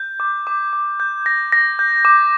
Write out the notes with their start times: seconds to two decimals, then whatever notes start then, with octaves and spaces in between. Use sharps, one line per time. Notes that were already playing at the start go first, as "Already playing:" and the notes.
Already playing: G6
0.20 D6
0.47 D6
0.73 D6
1.00 G6
1.26 A#6
1.52 A#6
1.79 G6
2.05 D6